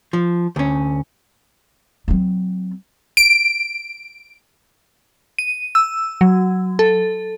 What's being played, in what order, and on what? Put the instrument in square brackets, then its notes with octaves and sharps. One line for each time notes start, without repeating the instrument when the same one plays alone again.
[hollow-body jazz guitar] F3
D2 C#4
[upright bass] F#3 C4
[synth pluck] D7
[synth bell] D#7
E6
F#3
A4